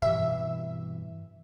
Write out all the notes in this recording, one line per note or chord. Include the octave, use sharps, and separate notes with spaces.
G2 B2 E3 E5